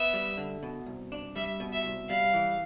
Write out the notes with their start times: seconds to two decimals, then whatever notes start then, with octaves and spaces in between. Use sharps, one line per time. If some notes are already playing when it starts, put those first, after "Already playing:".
Already playing: B3 E5
0.14 G3
0.37 D3
0.63 B2
0.86 C2
1.12 D4
1.36 G3 E5
1.60 B2
1.73 E5
1.85 C2
2.09 G3 F5
2.34 E3